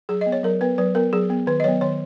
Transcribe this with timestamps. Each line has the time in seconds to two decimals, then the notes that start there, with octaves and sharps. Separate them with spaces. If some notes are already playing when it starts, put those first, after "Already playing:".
0.09 F#3 G#4
0.21 D#5
0.26 B3
0.32 C#5
0.44 F#3 A#4
0.61 B3 B4
0.78 F#3 B4
0.95 B3 A#4
1.13 F#3 G#4
1.30 B3
1.47 D#3 B4
1.60 D#5
1.64 F#3 B3 C#5
1.81 D#3 C#5